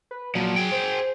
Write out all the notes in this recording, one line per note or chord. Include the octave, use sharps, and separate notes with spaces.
B4
A#2 F3 F#3
G#4 G5
C5